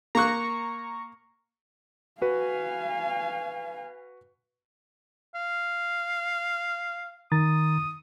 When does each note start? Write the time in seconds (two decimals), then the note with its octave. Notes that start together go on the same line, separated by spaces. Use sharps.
0.15 A#3 A#5 C#6 F#6
2.22 F#4 B4 F5 G#5
5.35 F5
7.32 D#3 A#5 D#6 A6